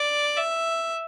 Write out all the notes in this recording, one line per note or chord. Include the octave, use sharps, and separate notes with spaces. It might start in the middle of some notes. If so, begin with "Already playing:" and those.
Already playing: D5
E5